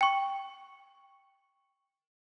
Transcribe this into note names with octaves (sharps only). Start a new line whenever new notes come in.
G5 C#6